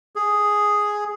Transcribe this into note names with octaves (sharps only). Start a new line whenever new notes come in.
G#4